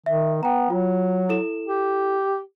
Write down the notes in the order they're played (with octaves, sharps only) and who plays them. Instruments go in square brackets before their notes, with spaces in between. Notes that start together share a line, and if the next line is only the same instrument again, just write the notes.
[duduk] D#3 [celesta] E5
[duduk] B3 [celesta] G5 A#5
[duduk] F#3 [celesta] F4
[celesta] E4 A4 E7
[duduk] G4